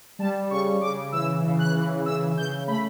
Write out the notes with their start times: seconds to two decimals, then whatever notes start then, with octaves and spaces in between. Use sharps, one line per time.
0.19 G3 A5
0.51 C#3 C#6
0.82 C#3 D6
1.12 E3 E6
1.44 C#3
1.59 F#6
1.75 E3
2.06 C#3 E6
2.37 C#3 G6
2.68 A3 B5